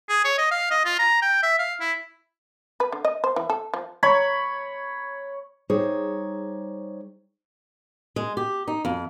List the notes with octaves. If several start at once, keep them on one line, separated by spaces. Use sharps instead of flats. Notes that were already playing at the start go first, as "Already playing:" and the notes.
G#4
C#5
D#5
F5
D#5
F4
A#5
G5
E5
F5
E4
B4
D3
D#5
C5
E3
A4
F3
C#5 B5
G3 D#4 G#4 C5 C#5
G#3
G4
D#4
F2